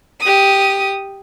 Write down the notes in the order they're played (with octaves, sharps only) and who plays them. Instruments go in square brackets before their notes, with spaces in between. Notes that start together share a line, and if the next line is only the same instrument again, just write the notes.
[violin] G4 D#6